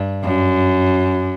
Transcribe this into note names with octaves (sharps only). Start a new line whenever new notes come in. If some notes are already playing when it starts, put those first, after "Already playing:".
Already playing: G2
F#2